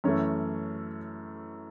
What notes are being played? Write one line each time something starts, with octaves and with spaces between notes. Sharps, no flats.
F#2 E3 A3 C#5